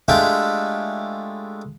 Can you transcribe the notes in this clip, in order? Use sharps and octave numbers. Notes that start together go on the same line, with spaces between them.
G#3 A3 D4 E4 F4 G4